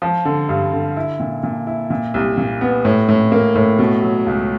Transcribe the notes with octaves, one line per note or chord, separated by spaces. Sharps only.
F3
D3
G2
D3
E4
A#2
A#2
E4
A#2
C2
A#2
B3
A2
A2
A#3
A2
B2
F#3
C#2